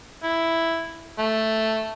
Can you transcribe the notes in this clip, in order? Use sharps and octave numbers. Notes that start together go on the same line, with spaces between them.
E4
A3